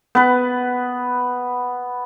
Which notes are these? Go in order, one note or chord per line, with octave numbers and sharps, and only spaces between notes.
B3 B4